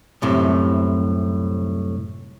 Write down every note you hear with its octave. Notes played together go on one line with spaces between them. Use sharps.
C2 F#2 A2 C3